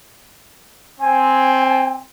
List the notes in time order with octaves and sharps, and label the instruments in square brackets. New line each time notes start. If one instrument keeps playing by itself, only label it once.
[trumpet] C4 [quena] G#5